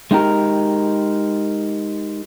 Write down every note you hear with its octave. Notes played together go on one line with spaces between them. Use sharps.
G#3 D#4 G4 A#4